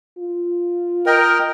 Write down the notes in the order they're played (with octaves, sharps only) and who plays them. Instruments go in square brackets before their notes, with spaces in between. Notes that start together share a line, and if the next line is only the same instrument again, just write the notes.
[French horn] F4
[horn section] A#4 [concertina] D#5 G5